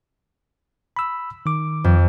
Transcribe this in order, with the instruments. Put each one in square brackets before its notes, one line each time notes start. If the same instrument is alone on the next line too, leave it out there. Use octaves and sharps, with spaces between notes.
[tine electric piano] B5 E6
D#3 D6
[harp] F2